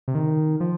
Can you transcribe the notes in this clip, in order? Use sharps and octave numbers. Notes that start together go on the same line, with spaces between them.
C3
D#3
F3